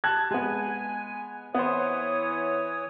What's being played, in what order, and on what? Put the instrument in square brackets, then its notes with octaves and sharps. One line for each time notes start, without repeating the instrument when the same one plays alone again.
[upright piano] A5 F#6 G#6
[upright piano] G#3 B3 [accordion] G#5
[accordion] E3 C#5 D#6 [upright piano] B3 C5